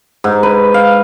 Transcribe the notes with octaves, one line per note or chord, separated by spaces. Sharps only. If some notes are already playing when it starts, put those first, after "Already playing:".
G#2
B4
F5